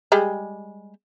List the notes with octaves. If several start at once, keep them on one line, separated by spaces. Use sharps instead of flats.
G3 G#3